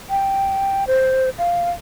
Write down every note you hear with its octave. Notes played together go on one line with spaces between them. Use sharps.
G5
C5
F5